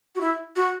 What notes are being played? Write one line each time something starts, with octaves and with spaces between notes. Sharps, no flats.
F#4
E4
F#4